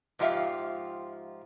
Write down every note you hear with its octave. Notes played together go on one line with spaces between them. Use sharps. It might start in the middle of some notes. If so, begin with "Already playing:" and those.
G#2 F3 F4 G4 E5 F5